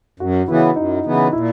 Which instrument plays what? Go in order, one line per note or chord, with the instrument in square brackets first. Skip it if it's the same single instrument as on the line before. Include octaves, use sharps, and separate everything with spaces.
[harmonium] F#2 [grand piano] F#4
[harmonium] C#3 E3 B3 [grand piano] E4
[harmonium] F#2 [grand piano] D#4
[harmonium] C#3 E3 B3
[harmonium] A#2 [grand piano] E4